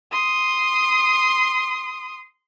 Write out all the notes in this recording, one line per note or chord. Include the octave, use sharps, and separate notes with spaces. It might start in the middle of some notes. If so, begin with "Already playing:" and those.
C6 D#6